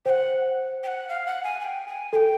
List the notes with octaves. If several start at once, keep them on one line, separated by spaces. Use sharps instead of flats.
C5 F#5 G5
G5
F#5
F5
F#5
G#5
G#5
G5
G#5
A4 G5 G#5